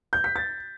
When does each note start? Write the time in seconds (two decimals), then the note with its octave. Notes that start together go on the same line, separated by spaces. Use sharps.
0.13 G6
0.24 B6
0.36 A6